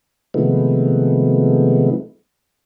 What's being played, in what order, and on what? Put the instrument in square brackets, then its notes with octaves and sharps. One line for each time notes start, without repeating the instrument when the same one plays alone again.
[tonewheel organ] C3 D#3 F3 G#3 A3 B3